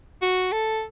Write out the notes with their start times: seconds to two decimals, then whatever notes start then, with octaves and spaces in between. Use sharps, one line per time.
0.22 F#4
0.52 A4